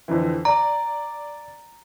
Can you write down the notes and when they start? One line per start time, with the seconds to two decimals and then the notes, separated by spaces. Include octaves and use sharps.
0.08 F2 D3 E3
0.45 D5 A#5